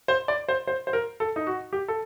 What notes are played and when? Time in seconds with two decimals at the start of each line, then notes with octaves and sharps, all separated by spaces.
0.08 C5
0.28 D5
0.49 C5
0.67 C5
0.87 C5
0.93 A#4
1.20 A4
1.36 D#4
1.47 F#4
1.73 G4
1.88 A4